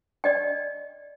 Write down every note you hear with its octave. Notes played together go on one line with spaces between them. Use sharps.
D5 D#5 G5